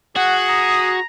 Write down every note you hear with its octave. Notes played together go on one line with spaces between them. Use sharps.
F#4 G#4 F#5
A#5 D#6